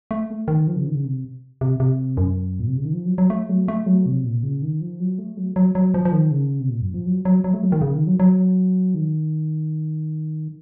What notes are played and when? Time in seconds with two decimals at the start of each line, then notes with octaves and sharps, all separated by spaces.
0.11 A3
0.48 D#3
0.67 F3
0.76 C#3
0.86 D#3
0.95 C#3
1.05 C3
1.61 C3
1.80 C3
2.17 F#2
2.60 A#2
2.68 C3
2.76 C#3
2.85 D#3
2.93 F3
3.05 F#3
3.18 F#3
3.30 A3
3.49 F#3
3.68 A3
3.86 F#3
4.06 C3
4.24 A#2
4.43 C#3
4.62 D#3
4.81 F3
5.00 F#3
5.19 A3
5.37 F#3
5.56 F#3
5.75 F#3
5.94 F3
6.05 F3
6.12 D#3
6.31 C#3
6.60 C3
6.69 A#2
6.81 F#2
6.94 F3
7.06 F#3
7.25 F#3
7.44 F#3
7.54 A3
7.63 F#3
7.72 D#3
7.81 C#3
7.94 D#3
8.07 F#3
8.20 F#3
8.95 D#3